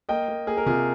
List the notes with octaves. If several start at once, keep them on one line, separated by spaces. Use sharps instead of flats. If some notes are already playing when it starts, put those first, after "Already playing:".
A#3 D#5 G5
A#3
A#3 G#4
A#4
C3 F4 G#4